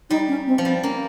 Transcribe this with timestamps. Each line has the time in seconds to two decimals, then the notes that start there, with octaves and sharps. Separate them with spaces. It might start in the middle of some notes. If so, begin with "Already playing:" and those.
0.10 G3 D#4
0.28 C#4
0.47 C4
0.58 F3
0.64 G3 C4
0.83 A#3 C#4